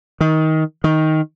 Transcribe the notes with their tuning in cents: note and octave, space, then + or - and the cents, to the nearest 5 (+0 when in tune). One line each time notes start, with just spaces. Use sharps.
D#3 +20
D#3 +10